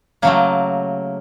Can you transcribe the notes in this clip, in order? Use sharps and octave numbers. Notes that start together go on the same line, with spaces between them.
C#3 F#3 A3 A#3